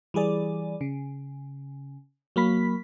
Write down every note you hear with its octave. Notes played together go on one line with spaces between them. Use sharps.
E3 G3 G#4 D5
C#3
F#3 A#3 B5 B6